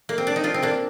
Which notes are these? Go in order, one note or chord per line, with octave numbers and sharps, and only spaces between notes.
A#3
C4
D4
D#4
D4 F4
C4
A#3 D4